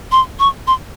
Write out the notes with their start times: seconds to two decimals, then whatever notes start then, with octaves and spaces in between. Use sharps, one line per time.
0.12 C6
0.39 C#6
0.67 C6